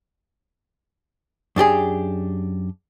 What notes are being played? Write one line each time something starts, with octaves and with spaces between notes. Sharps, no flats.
F#2 D4 G4 G#4